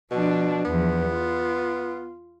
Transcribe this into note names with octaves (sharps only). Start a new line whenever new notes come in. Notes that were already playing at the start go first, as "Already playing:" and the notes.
B2 F3 D4
E2 F3 B3
F4